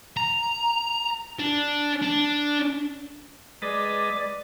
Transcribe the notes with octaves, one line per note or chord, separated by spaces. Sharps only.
A#5
D4
D4
G#3 B4 D5 D#5 D6